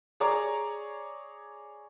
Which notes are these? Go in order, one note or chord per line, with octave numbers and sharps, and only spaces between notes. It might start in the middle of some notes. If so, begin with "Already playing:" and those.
G#4 C#5 D5 A#5 D6